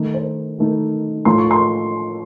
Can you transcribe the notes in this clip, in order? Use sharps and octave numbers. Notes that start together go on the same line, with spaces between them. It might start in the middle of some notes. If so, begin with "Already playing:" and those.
Already playing: D#3 A3 D#4
C5
D#3 A3 D#4
A2 F3 A3 C6
C#6
C6